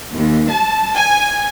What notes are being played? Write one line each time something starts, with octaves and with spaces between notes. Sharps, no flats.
D#2
A5
G#5